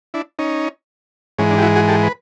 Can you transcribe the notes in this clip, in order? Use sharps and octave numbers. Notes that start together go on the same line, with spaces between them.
D4 E4
C#4 D#4
G#2 E3 G#3 C#4
D4
G4
E4 F#4
F#4 G#4
G4 A4
B4